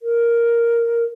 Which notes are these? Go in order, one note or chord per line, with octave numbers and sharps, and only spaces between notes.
A#4